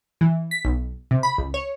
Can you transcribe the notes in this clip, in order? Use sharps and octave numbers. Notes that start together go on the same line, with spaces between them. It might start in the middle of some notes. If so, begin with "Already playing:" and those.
E3
B6
B1
C3
B5
C#2
C#5